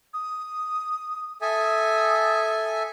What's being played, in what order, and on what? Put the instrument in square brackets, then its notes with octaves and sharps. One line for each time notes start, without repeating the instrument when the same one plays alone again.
[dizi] D#6
[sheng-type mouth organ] A4 E5 G#5 [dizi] D#6